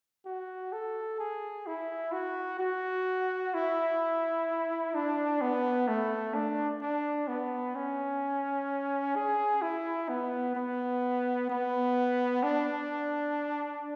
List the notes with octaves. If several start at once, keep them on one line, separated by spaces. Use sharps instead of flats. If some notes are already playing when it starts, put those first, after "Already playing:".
F#4
A4
G#4
E4
F#4
F#4
E4
D4
B3
A3
D4
D4
B3
C#4
G#4
E4
B3
B3
B3
D4